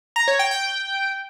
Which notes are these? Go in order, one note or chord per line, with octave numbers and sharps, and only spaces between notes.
A#5
C#5
G5
G5